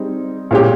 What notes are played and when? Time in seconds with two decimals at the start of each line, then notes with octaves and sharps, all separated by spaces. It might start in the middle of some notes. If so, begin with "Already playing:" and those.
Already playing: G3 C4 D#4 G#4
0.51 A#2 G#3 C#4 G4